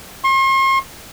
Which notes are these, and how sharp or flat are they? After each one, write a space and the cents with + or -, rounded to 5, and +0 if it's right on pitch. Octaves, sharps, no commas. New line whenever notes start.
C6 +45